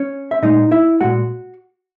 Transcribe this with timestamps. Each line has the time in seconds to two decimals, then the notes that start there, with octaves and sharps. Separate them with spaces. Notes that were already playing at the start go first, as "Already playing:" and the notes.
Already playing: C#4 C#5
0.31 E5
0.42 A#2 G#3 D#4 D#5
0.71 E4 E5
1.01 A#2 G#3 F#4 F#5